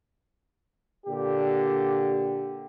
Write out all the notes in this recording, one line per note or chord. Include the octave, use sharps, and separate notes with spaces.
A#2 D3 G4